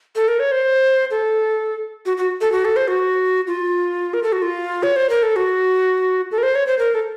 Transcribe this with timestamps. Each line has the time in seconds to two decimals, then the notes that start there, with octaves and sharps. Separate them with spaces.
0.16 A4
0.28 A#4
0.40 C#5
0.52 C5
1.11 A4
2.06 F#4
2.17 F#4
2.41 A4
2.52 F#4
2.65 A4
2.76 C5
2.88 F#4
3.47 F4
4.14 A#4
4.23 A4
4.32 F#4
4.42 F4
4.83 C#5
4.96 C5
5.10 A#4
5.23 A4
5.36 F#4
6.32 A4
6.38 A#4
6.43 C5
6.55 C#5
6.67 C5
6.79 A#4
6.95 A4